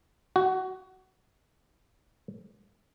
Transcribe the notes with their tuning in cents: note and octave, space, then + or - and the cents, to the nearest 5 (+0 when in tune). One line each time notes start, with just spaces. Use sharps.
F#4 +20